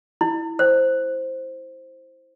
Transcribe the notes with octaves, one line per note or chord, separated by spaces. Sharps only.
E4
C5